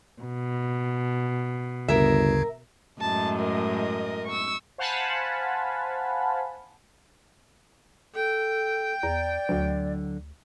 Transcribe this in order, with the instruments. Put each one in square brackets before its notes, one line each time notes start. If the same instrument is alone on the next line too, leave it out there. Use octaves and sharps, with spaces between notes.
[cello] B2
[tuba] G1 [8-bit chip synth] D2 C#3 G#6 [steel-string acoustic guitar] A#4 E5
[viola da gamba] F#2 A2 G#3 [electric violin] A5
[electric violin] A#4 D#5
C#6 E6
[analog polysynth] C5 F5 F#5 G#5 A5 B5
[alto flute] A4 [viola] G5
[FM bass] E2 [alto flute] D5 [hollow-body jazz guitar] A#5
[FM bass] D2 [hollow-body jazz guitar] D3 F#3